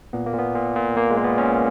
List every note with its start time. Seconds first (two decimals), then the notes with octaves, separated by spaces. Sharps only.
0.13 A#2 B3
0.26 A#3
0.34 A#2 B3
0.55 A#2
0.76 A#2
0.96 A#2 A#3
1.10 G#3
1.17 A#2
1.24 B3
1.38 A#2 C#4